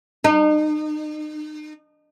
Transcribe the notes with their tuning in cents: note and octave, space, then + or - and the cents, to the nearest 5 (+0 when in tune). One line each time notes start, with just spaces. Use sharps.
D#4 -35